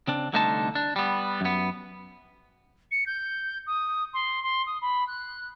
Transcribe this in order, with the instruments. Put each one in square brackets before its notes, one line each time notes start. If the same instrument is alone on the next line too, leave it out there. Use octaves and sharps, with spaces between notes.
[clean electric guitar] C#3 C4 D4
C2 D3 A3 D#4 C5 A5
D4
G3 B3
F#2 B3
[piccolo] C#7
G6
D#6
C6
C6
D#6
B5
F#6